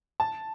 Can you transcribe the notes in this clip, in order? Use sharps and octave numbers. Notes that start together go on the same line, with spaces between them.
A5